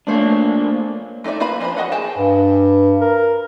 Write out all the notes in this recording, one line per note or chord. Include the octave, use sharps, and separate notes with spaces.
A3 A#3 D4 C5 C#5
A3 D#4 C5 D5 E5
A#3 F4 B4 F5 B5
F3 D4 B4 C5 B5
F#4 G#4 D#5 F5 F#5
G#4 G5 A5
G2
A#4